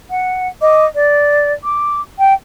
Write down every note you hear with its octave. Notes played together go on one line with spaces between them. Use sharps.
F#5
D#5 D6
D5
D6
G5